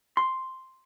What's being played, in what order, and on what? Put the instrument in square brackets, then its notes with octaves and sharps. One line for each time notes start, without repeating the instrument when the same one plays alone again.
[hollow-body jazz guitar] C6